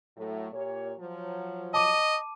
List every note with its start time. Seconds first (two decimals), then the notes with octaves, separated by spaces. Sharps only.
0.17 A2 F#3 A3
0.52 A#2 G4 C#5
1.00 F3 F#3
1.74 D#5 A5 D6 D#7